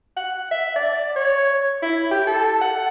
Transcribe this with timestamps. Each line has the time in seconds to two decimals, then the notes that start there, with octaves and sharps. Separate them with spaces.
0.17 F#5
0.51 E5
0.76 D5
1.16 C#5
1.82 E4
2.11 G4
2.27 A4
2.61 F#5